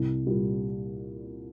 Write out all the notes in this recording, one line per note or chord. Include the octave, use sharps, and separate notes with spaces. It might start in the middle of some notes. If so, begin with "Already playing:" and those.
Already playing: C2
A#2 G3